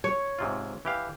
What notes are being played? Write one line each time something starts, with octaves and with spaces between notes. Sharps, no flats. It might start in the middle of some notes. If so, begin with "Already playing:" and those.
C#5
G#2 C3 F4
E3 G4 F5